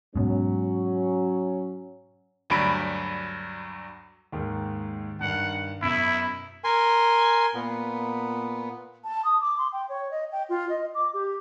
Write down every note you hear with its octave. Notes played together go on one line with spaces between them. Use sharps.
G#2 B2 F#3 C#4
D2 G2 F#3 D4 B5 D7
D#2 G#2 D#3
G2 D#3 F#5
F#2 B2 E4
A#4 G#5 C6
A#2 B3
A5
D#6
D6
C6
G5
C#5
D#5
G5
F4
D#5
D6
G4